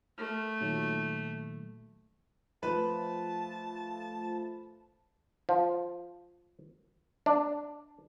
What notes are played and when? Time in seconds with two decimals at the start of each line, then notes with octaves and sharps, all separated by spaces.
0.18 A3 F6
0.60 A#2 D#3 F#3
2.63 F3 A3 B4 A5
5.49 F3
7.26 D4